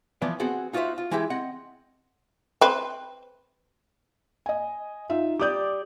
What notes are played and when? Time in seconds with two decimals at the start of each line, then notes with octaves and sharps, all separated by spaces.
0.22 E3 F3 B3 B4 D5
0.40 B3 C4 F#4 G#4 F#5
0.73 D#4 F4 F#4 B4 C5 E5
0.98 F4
1.11 E3 G#3 E4 G4 E5
1.30 C4 D#5 F#5
2.61 C4 B4
4.46 D#5 G#5
5.10 D#4 F4 E5
5.40 G4 D5 D6 D#6 G6